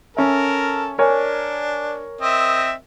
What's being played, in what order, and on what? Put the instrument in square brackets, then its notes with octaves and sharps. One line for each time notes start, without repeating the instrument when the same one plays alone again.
[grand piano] C#4 E5 [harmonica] A4 A#4
[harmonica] D4 [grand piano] A#4 C#5 G#5
[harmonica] C4 D#5 E5